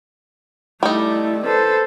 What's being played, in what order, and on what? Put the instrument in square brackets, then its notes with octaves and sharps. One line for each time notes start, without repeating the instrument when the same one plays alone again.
[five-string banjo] G3 D#4 [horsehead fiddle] A3 E4
[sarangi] A4 [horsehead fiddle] B4 C5